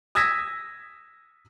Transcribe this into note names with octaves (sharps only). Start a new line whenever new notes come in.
D#6 E6 G#6 A#6 B6